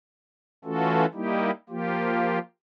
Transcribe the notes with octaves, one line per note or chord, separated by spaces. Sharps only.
E3 A3 C#4 F4 F#4 A4
G3 A#3 D#4 E4 G4
F3 A#3 F4 G4